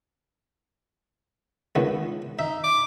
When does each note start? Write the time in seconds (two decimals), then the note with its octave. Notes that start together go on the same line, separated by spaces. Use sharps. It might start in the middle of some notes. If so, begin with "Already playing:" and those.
1.75 C#2 D#3 B3
2.39 D#4 E5
2.64 D6